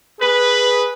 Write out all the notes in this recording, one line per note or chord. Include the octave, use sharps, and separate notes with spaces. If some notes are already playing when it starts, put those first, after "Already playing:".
G#4 B4